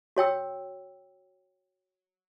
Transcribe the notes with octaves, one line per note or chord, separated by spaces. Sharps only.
F#4 C#5 G5 E6